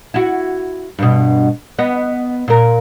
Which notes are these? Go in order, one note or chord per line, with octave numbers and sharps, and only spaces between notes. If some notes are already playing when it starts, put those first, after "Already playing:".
E4 F#4
G2 B2
B3 D#5
A#2 A#4